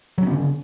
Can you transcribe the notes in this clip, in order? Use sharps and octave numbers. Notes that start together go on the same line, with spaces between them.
C#3 F#3 B3 C#4